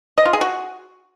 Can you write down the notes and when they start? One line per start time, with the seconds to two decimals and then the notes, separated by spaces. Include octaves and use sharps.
0.18 D#5
0.25 F4
0.33 G#4
0.41 F#4